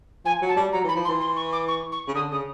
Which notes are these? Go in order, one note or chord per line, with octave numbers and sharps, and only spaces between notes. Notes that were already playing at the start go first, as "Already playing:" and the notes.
F3 G#5
F#3
A5
G3
F#3 A#5
E3
B5
F3
C6
E3
C6
C#6
D6
C#6
C#6
C#3
D3 D#6
C#3 D#6